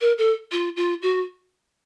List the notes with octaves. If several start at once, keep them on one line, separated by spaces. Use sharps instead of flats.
A#4
A4
F4
F4
F#4